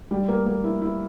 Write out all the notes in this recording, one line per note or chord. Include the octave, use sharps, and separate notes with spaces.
G3
A#3
A#3
E4
E4